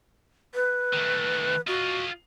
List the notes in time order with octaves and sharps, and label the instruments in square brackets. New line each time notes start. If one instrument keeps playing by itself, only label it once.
[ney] B4
[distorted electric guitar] D#3 A3
[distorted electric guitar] F4 D#5 [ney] F#4